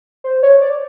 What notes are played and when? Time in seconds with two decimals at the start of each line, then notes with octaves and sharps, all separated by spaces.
0.24 C5
0.43 C#5
0.61 D5